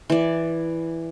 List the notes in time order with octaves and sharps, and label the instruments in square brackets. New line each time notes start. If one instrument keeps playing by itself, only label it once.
[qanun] E3 D5